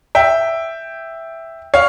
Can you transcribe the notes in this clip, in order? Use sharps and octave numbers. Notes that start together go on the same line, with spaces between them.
E5 G5
C#5 F5